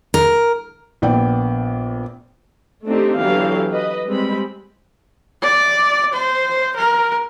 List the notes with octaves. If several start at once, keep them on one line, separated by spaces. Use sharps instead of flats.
A#4
A#1 B3 D5 G5
A3 C4 D4 D#4 G4
D3 E3 F#3 B3 G4 F5
B4 D#5
G3 G#3 C4 B5
D5
C5
A#4